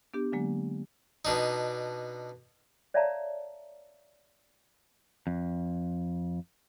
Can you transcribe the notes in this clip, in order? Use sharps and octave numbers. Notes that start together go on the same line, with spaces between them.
B3 D4 G4
D3 F#3 G#3 A#3
B2 D4 D#4
C#5 D5 E5 F5 A5 A#5
F2